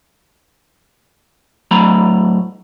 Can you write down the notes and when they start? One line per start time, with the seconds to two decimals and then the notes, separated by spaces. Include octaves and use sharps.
1.71 A2 F#3 A3 A#5 B5